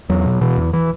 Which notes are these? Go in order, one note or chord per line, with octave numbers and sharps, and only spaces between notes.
E2 F#3
B2
B2 E3
E2
E3